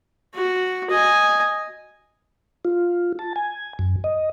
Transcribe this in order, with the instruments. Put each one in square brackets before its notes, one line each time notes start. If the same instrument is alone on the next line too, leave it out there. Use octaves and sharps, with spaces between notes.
[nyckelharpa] F#4
D#5 G#5
[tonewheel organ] F4
A5
G#5
F#2
D#5